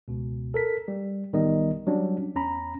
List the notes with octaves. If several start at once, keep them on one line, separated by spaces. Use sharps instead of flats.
C#2 B2
A4 A#4 B6
G3
A1 D#3 G3 B3 D#4 D#5
F#3 G3 C#4 D4
E2 C#4 A#5 B5